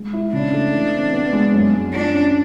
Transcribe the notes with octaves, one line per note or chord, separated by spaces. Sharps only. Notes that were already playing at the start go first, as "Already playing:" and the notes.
Already playing: G#3
E4
C#3 D4
A3
E3
C4
B3
G#3
F#2
G#3
D4 F4
C#4